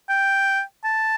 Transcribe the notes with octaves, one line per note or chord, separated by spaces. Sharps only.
G5
A5